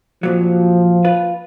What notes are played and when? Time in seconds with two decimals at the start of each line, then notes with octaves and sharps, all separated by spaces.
0.23 F2 A#2 F3 F#3
1.05 F4 B4